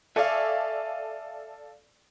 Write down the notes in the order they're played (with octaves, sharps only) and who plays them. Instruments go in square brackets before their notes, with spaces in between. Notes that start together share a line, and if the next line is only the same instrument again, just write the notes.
[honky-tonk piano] A4 D5 F5 [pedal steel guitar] E5 G#5 C#6